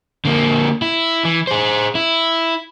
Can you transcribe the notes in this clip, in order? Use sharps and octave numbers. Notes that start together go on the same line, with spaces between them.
D3 A#3
E4
E3
G#4 C5
E4